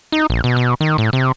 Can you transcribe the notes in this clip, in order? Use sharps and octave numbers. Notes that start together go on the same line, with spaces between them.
D#4
A#1
B2
B2
D#3
A2
C3